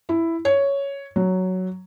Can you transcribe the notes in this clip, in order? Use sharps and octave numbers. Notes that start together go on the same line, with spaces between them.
E4
C#5
F#3